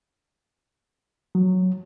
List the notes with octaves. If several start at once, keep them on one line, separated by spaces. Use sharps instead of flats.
F#3